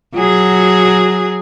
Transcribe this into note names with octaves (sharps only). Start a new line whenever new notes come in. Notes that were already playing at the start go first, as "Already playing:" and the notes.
F#3 G#4